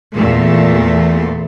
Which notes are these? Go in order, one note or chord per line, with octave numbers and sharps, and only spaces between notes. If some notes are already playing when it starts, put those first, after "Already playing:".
E2 A#2 A3